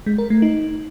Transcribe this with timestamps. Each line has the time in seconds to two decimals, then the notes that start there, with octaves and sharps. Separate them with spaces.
0.06 G#3
0.18 A#4
0.30 A3
0.42 D#4